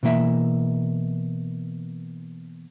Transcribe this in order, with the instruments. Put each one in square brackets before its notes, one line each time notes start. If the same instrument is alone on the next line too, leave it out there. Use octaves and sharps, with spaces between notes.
[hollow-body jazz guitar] B2 E3 A#3 E5